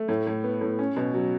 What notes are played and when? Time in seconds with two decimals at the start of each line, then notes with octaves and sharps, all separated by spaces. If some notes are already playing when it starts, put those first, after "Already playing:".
Already playing: A3
0.08 A2
0.27 A2
0.44 B3
0.61 A2
0.79 C#4
0.96 B2
1.14 F#3